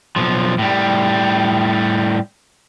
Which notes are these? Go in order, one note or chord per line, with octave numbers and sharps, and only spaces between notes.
B1 F3
A2 G3